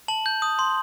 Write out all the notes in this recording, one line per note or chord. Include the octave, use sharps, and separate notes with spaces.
A5 F#7
G6
D#6
C6